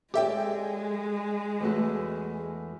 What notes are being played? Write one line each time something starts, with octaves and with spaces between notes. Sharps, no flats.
G#3 G4 A4 D5 E5 G5
E2 A3 F#4